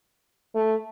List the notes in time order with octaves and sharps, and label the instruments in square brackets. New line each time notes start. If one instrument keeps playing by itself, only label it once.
[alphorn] A3